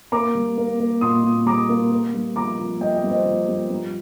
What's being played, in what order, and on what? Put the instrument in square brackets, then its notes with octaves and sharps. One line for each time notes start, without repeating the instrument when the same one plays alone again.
[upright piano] A#3 A#5 D6
G3
A#3
A#3
A#2 C6 D#6
A#2
G3 A#5 D6
A#3
A#3
G2
F3 A#5 D6
F3
G2 D#5 G5
D#5 G5
G2
C5 D#5
F3
G2
G2